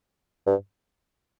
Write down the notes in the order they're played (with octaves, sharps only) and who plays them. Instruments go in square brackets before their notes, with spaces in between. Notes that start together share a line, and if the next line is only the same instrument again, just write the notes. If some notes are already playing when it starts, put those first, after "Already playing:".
[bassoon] G2